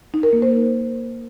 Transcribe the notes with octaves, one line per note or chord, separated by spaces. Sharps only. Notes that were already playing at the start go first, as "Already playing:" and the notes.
D#4
A#4
A#3
C5